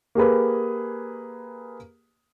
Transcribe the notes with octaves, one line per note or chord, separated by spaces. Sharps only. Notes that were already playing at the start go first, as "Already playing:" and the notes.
A#3 G4 G#4 B4